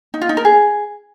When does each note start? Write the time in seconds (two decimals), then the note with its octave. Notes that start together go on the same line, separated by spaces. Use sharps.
0.14 D#4
0.21 F4
0.29 D#4
0.37 A#4
0.45 G#4